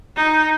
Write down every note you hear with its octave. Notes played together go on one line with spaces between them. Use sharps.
D#4